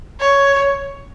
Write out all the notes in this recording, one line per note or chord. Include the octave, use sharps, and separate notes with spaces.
C#5